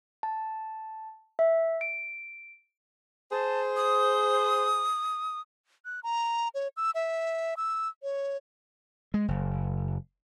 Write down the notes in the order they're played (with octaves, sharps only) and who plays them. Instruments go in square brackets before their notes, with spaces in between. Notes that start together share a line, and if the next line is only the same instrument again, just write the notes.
[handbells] A5
E5
D7
[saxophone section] G#4 C5 [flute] A5
[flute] D#6
[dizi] F#6
A#5
C#5
E6
E5
E6
C#5
[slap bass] G#3
F#1